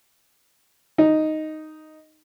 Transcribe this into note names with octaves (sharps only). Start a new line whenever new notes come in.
D#4